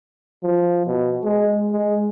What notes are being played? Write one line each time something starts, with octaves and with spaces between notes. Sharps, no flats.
F3
B2
G#3
G#3